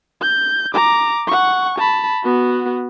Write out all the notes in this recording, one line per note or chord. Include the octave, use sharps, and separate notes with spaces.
G6
A#5 D6
F#5 C#6
A5 B5
B3 F#4